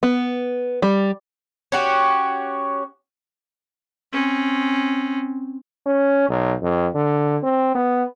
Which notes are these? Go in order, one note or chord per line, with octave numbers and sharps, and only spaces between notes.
B3
G3
C#4 F#4 G4
C4 C#4
C#4
B1
F2
D3
C4
B3